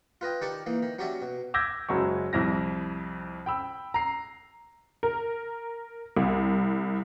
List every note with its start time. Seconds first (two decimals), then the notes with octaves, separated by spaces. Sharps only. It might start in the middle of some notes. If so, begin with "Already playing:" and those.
0.21 F4 B4 D#5 G5
0.41 D#3 G4 D5 A5 C#6 D6
0.66 E3 A#3 D#4
0.82 D#3
0.99 F#3 C#4 G4 C#5 D5 E5
1.22 B2
1.54 D6 E6 G6 G#6 A#6 B6
1.89 F#1 F#3 G#3 C#6
2.33 C2 F2 E4 A#6
3.46 G5 B5 E6
3.94 A#5 C7
5.03 A#4
6.17 C2